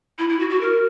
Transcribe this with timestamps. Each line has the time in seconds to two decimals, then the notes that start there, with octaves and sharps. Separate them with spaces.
0.19 E4
0.29 E4
0.39 F#4
0.50 F#4
0.61 A#4